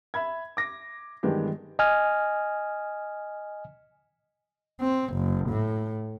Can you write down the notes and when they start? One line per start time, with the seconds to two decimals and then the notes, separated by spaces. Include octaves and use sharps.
0.14 E5 B5 G#6
0.57 D6 A#6
1.23 G2 D#3 E3 G#3 B3 G4
1.79 D#5 G#5 F6
4.81 C4
5.14 F#1
5.49 A2